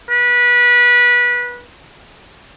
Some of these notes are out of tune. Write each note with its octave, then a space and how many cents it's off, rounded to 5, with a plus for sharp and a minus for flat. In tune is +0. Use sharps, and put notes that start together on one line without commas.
B4 -25